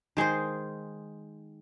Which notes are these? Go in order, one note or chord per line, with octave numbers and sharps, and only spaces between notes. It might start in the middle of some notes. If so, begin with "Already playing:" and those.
D#3 G#3 G#4 C5